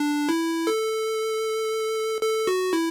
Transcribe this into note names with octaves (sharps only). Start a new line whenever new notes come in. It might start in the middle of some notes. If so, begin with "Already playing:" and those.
Already playing: D4
E4
A4
A4
F#4
E4